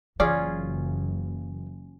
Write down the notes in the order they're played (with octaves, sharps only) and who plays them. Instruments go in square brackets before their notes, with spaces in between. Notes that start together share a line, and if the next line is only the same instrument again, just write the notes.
[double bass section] F#1 [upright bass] E3 [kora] C#4 F4 G#4 [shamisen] D5